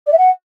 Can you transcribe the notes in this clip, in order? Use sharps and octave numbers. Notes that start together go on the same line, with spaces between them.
D5
E5
F#5